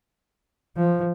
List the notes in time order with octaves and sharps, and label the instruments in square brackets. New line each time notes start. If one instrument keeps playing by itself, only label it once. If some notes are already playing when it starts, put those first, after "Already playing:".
[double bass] F3